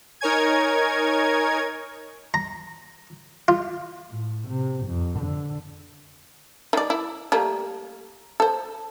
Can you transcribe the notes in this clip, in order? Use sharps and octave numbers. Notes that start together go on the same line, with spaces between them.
D#4 A#4 C#5 G#5 G#6
A#5
F4
A2
C3
F2
D3
D#3 D5
E4
G3 A3 A#3
A4 C5